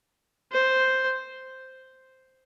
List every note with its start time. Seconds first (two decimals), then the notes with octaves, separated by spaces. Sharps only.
0.52 C5